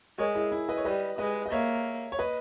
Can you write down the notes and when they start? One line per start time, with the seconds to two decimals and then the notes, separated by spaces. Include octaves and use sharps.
0.19 G#3 A#4 C#5
0.35 E4 G#4
0.52 E4
0.69 B4 D#5
0.77 C#5
0.85 G3 B4 D#5
1.18 G#3 B4 D#5
1.46 D#5
1.52 A#3 C#5 E5
2.12 C#5
2.19 B4 D#5